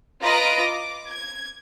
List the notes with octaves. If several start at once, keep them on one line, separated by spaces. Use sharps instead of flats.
F4 B4 D#5 A#5 A#6 D7
D6
G#6